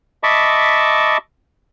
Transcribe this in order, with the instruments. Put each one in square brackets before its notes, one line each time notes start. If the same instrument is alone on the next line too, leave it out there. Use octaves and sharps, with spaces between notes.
[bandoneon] D#5 E5 A5 B5 C#6 D6